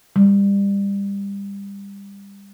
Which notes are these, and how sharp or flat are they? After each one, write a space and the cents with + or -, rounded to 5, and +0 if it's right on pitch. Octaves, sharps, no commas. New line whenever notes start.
G3 +25